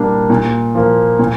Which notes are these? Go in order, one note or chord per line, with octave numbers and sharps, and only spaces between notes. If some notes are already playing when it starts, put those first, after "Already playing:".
Already playing: A#2 G3 A#3 D4
A#2
F3 A#3
A#2